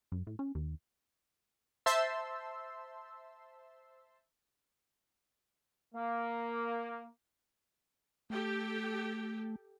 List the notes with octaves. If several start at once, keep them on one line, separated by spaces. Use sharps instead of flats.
F#2
A2
C#4
D#2
C5 E5 A5 C6 E6
A#3
A3 G4 A4 G5